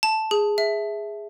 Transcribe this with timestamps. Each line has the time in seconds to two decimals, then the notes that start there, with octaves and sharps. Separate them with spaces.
0.03 A5
0.31 G#4
0.58 E5